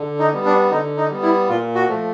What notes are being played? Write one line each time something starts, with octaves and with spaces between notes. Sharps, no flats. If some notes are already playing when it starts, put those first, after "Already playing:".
Already playing: D3
D#4
G3 B3
D4
D3 D#4
D#4
G3 B3
E4
A#2 F4
F#4
F3 A3